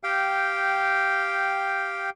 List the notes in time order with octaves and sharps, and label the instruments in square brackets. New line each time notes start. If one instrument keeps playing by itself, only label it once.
[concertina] G4 F5 G5